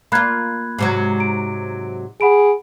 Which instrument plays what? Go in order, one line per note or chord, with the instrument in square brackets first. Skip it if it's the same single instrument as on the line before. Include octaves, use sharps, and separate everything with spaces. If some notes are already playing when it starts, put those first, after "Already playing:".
[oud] A#3 F4 [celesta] B5 F#6 G#6
[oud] G#2 C3 F#3
[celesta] D7
[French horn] G#4 [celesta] F#5 B5 D7